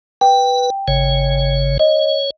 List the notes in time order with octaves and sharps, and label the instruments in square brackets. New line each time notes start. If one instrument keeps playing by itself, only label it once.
[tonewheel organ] B4 [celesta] G5
[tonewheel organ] G#1 C#3 C#5
[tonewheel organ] C#5 [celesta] D#5